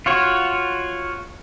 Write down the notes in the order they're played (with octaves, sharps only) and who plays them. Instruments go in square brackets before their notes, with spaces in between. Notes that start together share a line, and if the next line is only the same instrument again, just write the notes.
[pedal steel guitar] F4 F#4 C#5